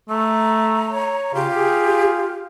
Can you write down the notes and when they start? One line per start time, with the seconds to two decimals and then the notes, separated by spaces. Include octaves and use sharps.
0.10 A3 A#5
0.92 C#5
1.35 C#3 F4 G4
1.54 G#4